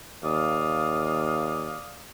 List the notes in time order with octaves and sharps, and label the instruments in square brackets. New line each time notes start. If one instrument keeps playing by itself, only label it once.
[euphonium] D#2 [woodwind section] D5 F5 D#6